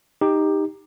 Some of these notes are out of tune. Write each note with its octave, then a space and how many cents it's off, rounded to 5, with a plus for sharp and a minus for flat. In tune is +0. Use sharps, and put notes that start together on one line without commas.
D#4 +0 G4 +15